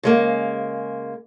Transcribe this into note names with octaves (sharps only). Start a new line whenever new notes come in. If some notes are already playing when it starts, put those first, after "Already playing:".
C#3 G#3 A#3